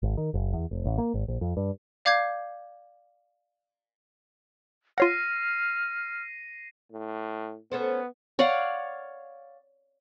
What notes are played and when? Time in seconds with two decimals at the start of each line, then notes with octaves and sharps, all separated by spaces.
0.03 G#1
0.17 D#3
0.34 F#1
0.53 E2
0.71 F1
0.85 A1
0.98 A#3
1.14 G#1
1.28 A#1
1.41 F2
1.57 G2
2.05 D5 F5 D6 G6 G#6 C7
4.98 F4 C#5 F#5 F6 A#6 C7 D#7
6.91 A2
7.72 B3 C#4 A4 C5
8.39 C#5 D5 F5 F#5